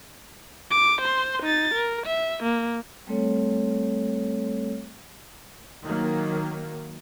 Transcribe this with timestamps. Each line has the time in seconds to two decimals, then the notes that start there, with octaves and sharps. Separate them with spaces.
0.71 D6
1.01 C5 C6
1.42 D#4 A6
1.74 A#4
2.06 E5
2.43 A#3
3.07 G3 A3 C4 A4 C#5
5.84 D#3 F#3 A#3